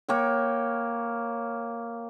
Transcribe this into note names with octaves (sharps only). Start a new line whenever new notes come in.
A#3 C#5 G5